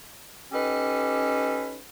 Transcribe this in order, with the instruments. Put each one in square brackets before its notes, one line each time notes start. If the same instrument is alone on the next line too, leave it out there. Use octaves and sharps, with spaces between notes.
[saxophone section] C#4 D#4 G4 A4 B4